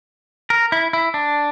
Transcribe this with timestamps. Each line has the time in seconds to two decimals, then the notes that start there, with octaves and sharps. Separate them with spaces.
0.50 A#4
0.72 E4
0.93 E4
1.14 D4